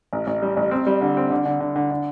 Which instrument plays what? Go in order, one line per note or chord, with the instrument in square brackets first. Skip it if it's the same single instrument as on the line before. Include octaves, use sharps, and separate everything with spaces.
[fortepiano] A1
A1
G3
A1
C4
G3
D3
C4
D3
D3
D3
D3
D3